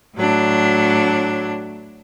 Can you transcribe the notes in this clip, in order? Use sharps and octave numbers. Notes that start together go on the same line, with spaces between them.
A2 F#3 D4